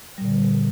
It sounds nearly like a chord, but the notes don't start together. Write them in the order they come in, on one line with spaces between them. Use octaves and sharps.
G3 A#2 D3